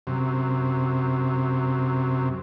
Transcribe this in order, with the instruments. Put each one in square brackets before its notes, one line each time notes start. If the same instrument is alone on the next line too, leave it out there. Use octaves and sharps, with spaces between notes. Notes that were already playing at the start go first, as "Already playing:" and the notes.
[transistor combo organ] F#2 C3